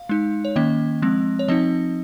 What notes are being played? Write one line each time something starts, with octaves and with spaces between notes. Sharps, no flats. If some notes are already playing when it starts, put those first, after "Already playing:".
Already playing: F5
G#3 D#4
C#5
D#3 A#3 C#4 D#5
F3 G#3 C4
C#5
F3 C4 D#4 D#5